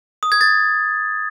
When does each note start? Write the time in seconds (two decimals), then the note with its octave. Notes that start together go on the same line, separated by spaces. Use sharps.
0.23 D#6
0.32 G#6
0.41 A6